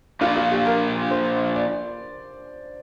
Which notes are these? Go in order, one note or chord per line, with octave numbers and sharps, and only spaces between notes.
A#2 F3 D4 F4
F4
G4
A#4
C5
D5